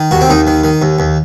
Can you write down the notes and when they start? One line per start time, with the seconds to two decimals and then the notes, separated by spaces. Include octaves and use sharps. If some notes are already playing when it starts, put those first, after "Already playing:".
Already playing: D#3
0.11 D#2 F#4
0.21 C4
0.29 D#2 D#4
0.47 D#3
0.64 D#3
0.82 D#2
0.99 D#2